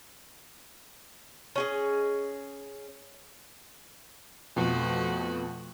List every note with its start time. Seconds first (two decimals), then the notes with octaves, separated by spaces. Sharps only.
1.56 C#4 G#4 D#5
4.56 F2 B2 F3 A3 F#4